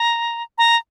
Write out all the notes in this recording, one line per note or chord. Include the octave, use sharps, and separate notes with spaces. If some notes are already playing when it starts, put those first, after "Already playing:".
Already playing: A#5
A#5